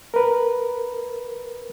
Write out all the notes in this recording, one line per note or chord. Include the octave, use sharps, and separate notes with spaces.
A#4 B4